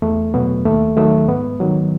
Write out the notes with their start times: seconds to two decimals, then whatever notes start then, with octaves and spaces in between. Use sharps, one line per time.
0.02 E2 A3
0.34 B2 F#3 B3
0.65 D#2 A3
0.97 D#3 F#3 A3
1.28 G#2 B3
1.60 D#3 F#3